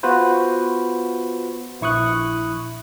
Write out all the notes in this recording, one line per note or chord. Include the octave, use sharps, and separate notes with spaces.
B3 F4 F#4 B4 C5
A#1 E4 C#6 D#6 F#6